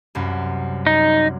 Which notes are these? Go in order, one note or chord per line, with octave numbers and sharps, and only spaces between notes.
C2 F#2
D#4